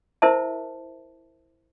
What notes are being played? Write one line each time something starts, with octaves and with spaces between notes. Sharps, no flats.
E4 A#4 C5 E5 A5